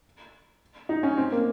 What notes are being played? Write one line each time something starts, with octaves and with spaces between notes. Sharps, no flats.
D#4
C#4
C4
A#3